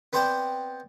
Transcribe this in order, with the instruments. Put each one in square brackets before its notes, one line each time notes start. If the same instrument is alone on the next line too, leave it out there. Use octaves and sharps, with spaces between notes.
[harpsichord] B3 C4 C5 D5 G5